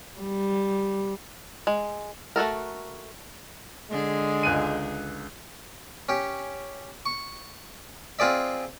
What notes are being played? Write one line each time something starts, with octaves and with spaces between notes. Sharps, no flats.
G3
G#3
A3 F#4 A4 A#4
D3 G#3 G#4
C#2 F#6 D#7
C#4 G4
C#6
C4 F4 G#4 D5 E5